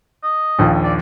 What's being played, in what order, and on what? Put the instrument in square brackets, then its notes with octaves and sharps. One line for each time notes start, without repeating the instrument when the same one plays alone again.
[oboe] D#5
[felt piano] A#1 D#2 F3
[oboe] D5